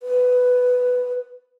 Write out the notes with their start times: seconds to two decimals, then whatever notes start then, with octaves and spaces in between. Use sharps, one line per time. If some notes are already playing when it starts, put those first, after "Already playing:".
0.03 B4